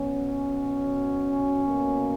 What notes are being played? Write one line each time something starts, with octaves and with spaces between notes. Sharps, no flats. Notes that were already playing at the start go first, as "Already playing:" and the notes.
Already playing: B2 F#3 B3 C#4
B2 A#3